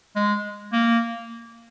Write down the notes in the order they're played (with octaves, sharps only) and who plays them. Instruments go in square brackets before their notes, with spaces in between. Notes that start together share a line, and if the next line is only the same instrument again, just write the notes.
[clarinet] G#3
A#3